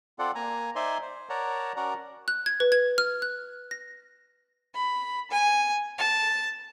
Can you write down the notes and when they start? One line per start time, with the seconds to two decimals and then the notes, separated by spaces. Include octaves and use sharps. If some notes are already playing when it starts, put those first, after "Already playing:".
0.19 C4 F4 A4 D5 F#5
0.35 A#3 G#5 A#5
0.75 D#4 C5 D5 E5 G#5 C6
1.02 C5
1.29 A#4 C#5 D5 F#5 A5 A#5
1.76 C#4 F#4 A#4 D5 F#5 A#5
2.28 F#6
2.46 G#6
2.60 B4
2.72 G#6
2.98 F6
3.22 F#6
3.71 A#6
4.75 B5
5.30 G#5
5.98 A5